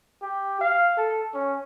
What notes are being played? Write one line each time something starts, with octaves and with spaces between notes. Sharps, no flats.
G4
F5
A4
C#4